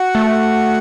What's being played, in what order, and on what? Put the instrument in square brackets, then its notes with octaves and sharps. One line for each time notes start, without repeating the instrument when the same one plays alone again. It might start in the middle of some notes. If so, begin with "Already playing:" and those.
Already playing: [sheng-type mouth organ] F#4 F#5
[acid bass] A3